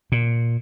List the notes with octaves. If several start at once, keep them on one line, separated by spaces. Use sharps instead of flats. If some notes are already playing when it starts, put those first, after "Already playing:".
A#2